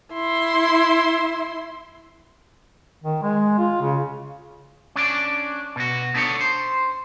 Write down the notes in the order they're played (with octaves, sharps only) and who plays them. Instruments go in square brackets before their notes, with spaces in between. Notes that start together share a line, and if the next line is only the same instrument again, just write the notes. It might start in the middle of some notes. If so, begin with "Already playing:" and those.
[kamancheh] E4 C6
[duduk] D#3
G#3
F4
C#3
[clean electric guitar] C#4 D4 D5
B2 F#4
B3 D4 D#4 A4 C#5
C5